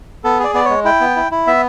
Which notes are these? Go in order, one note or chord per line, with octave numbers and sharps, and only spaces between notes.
B3 A4
G#4 D5
B3 D5
G#3 C#5
E4 G5
B3
E4
E4
B3 E5